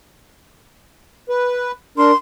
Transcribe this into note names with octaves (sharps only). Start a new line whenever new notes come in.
B4
D4 A#4 C6